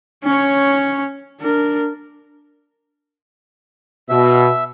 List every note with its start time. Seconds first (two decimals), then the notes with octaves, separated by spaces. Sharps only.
0.24 C#4 C#5
1.41 D4 A#4
4.09 B2 E5